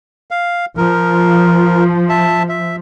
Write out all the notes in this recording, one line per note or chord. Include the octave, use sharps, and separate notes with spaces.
F5
F3 A#4
E5 A5
E5